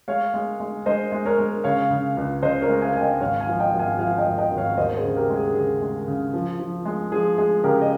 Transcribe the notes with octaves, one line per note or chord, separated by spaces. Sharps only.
G#3 C#5 F5
G#3
G#3
G#3 C5 D#5
G#3
A#4 C#5
G#3
C#3 C#5 F5
C#3
C#2
C#3 C5 D#5
A#4 C#5
G#3
F5 G#5
G#3 G#5
D#5 G5
G#1 C#5 F5
F5 G#5
F3
D#5 G5
G#1
F5 G#5
F3 F5 G#5
D#5 G5
G#1
D#5 G5
G#1
C#5 F5
D#2 C5 D#5
G#4 C5
C#3
G4 A#4
G#3
G#4
C#3 G#4
G#3
C#3
F3
F3
G#3
F3 G#4
G#3 G#4
C#3 G4 A#4
D#5